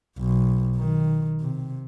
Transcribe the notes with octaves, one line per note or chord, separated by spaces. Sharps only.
B1
D#3
C3